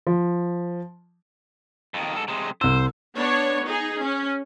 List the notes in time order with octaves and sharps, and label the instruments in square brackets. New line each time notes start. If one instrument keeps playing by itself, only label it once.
[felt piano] F3
[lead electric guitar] F2 D#3
G#2 A4
C3 G#3
[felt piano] C2 E6 [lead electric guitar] C5
[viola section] B3 D4 C#5
D#4 G#4
C#4